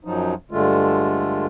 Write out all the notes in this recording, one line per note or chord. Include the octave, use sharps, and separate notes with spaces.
F#2 F3 F#3 D#4
G2 D3 G#3 A3 F4